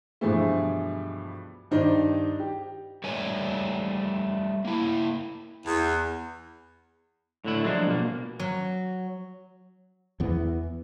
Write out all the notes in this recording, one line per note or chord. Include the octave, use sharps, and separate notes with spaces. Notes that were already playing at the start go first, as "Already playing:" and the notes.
G2 B2 E3 F3 G#3 A3
G2 D#3 D#4 C5 D5
G4
G3 A3 C#5 G#5
A#3 E4
E2
A2 D3 E4
F3 F#3 G#3 D4
B2 A#3
F#3
E2 E3 B3